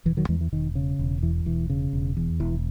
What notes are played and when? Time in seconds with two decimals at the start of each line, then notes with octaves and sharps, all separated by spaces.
0.05 E1 E3
0.17 D#3 F#3
0.29 E2 E3 G#3
0.41 E3
0.52 E1 D#3
0.75 C#3
0.99 E1
1.22 E2 E3
1.46 E1 E3
1.70 C#3
1.93 E1
2.17 E2
2.40 E1 E3